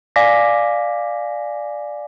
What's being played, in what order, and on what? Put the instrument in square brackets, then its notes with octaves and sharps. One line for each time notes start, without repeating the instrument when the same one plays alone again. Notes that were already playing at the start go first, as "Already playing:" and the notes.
[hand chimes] D5 F5 G#5 D6 A#6 B6